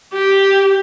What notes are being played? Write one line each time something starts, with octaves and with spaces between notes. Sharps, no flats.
G4